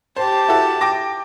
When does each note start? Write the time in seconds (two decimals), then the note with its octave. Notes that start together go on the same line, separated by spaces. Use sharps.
0.16 G4 C5 A5
0.48 E4 F#4 A4
0.81 G5 D6 A#6